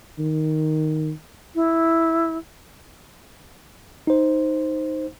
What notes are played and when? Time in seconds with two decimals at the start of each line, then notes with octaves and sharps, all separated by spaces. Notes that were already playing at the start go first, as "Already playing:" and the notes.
0.19 D#3
1.55 E4
4.07 D#4 C5